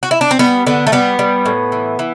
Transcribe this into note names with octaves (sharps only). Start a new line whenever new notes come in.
F#4
E4
D4
C4
G3 B3
D3 B3
A3
G3 B3
G3
A2
E3
E3